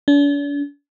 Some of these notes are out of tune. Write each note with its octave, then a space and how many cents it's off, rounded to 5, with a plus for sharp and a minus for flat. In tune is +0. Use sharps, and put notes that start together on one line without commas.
D4 -45